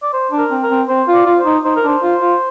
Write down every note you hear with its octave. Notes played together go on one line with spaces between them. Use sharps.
D5
C5
D4
A#4
C4
A#4
C4
C4 C5
F4
D5
F4
C5
D#4
D#4 C5
A#4
D4 C5
F4
F4